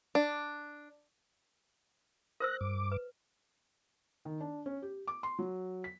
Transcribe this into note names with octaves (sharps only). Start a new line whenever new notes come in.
D4
A#4 C5 E6 F#6 A#6
G2 D6
B4
D#3
D4
C#4
G4
D6
C6
F#3
B6